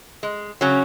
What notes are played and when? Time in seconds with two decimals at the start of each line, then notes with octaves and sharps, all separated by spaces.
0.23 G#3
0.61 C#3 F#3 C#4